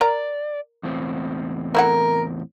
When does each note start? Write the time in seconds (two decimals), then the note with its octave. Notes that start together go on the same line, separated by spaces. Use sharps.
0.01 A#4 D5 A#5
0.83 E2 A2 C4
1.75 A3 E4 A#4 F#5